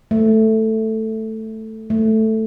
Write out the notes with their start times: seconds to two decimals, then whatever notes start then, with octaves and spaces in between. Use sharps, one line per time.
0.11 A3
1.90 A3